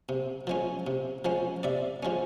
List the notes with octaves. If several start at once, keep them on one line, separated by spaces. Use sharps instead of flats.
C3
F3 G#3 C#4
C3
F3 G#3 C#4
C3 D5 E5
F3 G#3 C#4